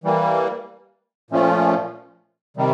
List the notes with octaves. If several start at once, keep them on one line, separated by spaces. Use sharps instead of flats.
E3 G3 A#3
A#2 F3 A3 C#4 F4
C3 D#3 G3